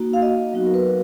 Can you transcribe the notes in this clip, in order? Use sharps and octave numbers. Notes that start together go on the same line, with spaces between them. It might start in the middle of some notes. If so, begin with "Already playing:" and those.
Already playing: A#3 D#4 F#4
F5
D#5
F#3 B3 D#4 F#4
A#4
B4